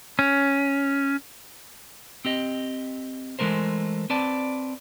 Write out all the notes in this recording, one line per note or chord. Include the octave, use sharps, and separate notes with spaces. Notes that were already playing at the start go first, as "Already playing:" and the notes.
C#4
C4 G4 D#5
E3 F3 G#3 A3 A#4 C5
C4 B4 D5 A5